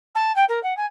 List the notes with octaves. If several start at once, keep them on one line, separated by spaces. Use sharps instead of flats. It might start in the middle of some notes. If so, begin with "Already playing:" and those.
A5
G5
A#4
F#5
G#5